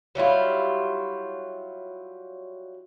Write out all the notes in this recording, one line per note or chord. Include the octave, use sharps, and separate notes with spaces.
F#3 G3 E4 F4